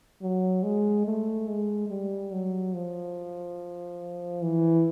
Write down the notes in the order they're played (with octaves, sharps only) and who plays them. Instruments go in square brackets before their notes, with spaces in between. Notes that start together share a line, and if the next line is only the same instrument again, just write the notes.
[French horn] F#3
G#3
A3
G#3
G3
F#3
F3
E3